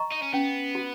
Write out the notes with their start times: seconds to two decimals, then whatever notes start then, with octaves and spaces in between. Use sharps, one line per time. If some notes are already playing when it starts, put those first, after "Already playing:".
Already playing: D#5 A#5 C#6
0.12 D#4
0.22 C#4
0.33 B3 C#4
0.75 F#4